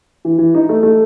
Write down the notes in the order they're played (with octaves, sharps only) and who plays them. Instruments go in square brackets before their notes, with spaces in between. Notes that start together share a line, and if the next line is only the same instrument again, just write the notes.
[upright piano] E3
E3
D#4
A3
A3